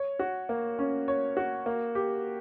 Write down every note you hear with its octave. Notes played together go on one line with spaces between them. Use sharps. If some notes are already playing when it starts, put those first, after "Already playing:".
Already playing: C#5
F#4
A#3
C#4
C#5
F#4
A#3
G4